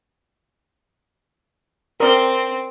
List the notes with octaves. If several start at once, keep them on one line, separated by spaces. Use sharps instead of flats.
C4 A#4 D5